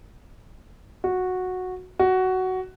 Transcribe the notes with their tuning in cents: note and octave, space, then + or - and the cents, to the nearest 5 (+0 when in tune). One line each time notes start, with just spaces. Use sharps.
F#4 -10
F#4 +10